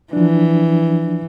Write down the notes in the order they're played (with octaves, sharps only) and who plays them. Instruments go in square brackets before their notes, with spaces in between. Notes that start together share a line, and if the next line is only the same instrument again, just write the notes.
[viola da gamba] E3 [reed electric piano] F3 D4